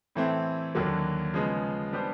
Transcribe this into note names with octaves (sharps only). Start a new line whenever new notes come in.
A2 E3 A3 C4
D#2 D3 F#3 A#3
C#3 F3 G#3 B3
G3 B3 D4 G4 C5